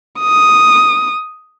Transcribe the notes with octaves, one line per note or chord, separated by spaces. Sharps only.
D#6